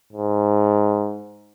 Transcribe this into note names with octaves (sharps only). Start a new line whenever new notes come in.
G#2